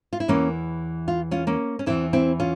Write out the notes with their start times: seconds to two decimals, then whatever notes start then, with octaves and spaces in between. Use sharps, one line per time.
0.13 F4
0.20 E4
0.28 E2 E3 A#3 C#4
1.08 F4
1.31 C#4 F4
1.47 A#3 C#4
1.79 C#4
1.86 E2 E3 C4 E4
2.13 C4 E4
2.40 C#4 F4